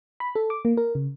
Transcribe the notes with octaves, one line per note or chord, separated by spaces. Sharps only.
B5
A4
D6
A#3
A#4
C#3